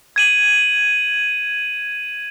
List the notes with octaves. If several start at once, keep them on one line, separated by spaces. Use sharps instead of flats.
G#6 D#7 F#7